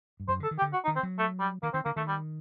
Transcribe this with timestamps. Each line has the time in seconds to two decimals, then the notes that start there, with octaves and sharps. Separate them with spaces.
0.20 G2
0.28 F#2 C5
0.40 D3 A4
0.51 D#3
0.58 G4
0.62 D3
0.73 F#4
0.84 D#4
0.88 D#3
0.96 C4
1.03 F#3
1.19 A3
1.40 G3
1.63 D#3 A#3
1.73 D#3 C4
1.85 D3 A#3
1.96 D#3 A3
2.08 G3